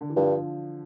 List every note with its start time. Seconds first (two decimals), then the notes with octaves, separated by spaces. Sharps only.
0.01 D3
0.09 E3
0.16 G2 D3 F3